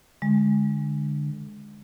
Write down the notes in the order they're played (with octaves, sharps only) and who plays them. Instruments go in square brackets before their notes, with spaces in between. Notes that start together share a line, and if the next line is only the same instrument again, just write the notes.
[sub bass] D3 [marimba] G#3